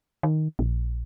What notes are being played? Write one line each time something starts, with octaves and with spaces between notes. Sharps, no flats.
D#3
A#1